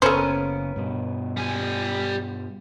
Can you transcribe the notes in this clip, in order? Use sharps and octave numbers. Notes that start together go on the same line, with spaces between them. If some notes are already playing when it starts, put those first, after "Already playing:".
F#1 C#3 B3 C#4 A4 A#4 C5
G2 B2
G3 G#5